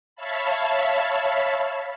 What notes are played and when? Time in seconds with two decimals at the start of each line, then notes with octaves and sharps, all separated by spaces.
0.16 C#5 E5 F5 A5 B5